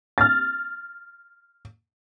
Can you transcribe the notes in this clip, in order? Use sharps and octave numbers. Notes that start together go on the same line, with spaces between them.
F6 A6